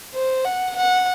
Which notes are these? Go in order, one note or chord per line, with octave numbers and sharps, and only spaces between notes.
C5
F#5
F#5